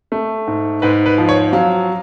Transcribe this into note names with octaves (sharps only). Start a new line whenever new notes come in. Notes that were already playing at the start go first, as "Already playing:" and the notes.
A3
G#2
G#2 B4
B4
F3
C#5
F#3 F5